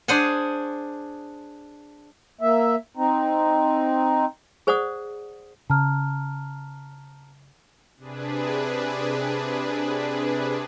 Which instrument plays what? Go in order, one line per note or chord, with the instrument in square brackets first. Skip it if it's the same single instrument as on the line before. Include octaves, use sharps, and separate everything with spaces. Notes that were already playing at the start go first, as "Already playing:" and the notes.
[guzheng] D4 G#4 C5 F#5 G#5
[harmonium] A#3 E5
C4 D#4
[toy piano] G#4 C5 D5 F#5 D#6
[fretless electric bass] C#3 [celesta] A5 A#5 F6
[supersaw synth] C3 D4 G#4 B4